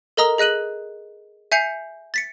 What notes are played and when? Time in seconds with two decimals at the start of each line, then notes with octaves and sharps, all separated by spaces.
0.17 A4 A#4 D#5 A#5 D#6 G7
0.38 G#4 D#5 F#6 D#7 F#7
1.52 E5 G#5 G6 C7 C#7 F7
2.14 A6 B6 C#7